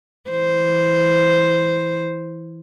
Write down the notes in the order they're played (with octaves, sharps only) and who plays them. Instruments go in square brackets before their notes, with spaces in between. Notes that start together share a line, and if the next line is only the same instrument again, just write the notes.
[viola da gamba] E3 C5